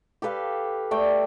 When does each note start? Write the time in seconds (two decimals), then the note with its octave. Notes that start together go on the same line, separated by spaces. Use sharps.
0.22 G4 A4 B4 F5
0.91 A3 D5 G5